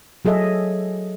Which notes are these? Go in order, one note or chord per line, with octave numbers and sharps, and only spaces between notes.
F#3 G#4 A4 D#5 E5